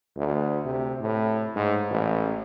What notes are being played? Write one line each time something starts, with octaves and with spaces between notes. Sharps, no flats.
D2
C3
A2
G#2
A1